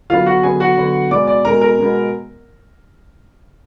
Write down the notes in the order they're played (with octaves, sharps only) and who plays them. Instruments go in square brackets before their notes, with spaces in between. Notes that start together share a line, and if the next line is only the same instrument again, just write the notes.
[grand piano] D3 F#3 B3 F4 F5
F#4 F#5
D3 F#3 B3 G#4 G#5
F#4 F#5
D3 F#3 B3
B2 G#3 B3 D5 D6
D5 D6
B2 G#3 B3 A#4 A#5
A#4 A#5
B2 G#3 B3